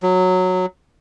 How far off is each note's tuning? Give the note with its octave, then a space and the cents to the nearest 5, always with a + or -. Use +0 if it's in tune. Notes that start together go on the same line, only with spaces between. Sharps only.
F#3 -10